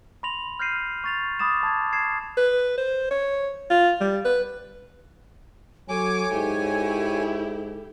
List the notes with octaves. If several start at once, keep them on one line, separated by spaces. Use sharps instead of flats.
B5 C6 A#6 F7 F#7
F6 G6 A#6 C7 D#7
C#6 A6 F7
B5 D6 D#6 A6 E7
A5 G#6
G#6 C7 E7
B4
C5
C#5
F4
G3
B4
F#3 A4 C#5 G#5 D6
G#2 E4 G4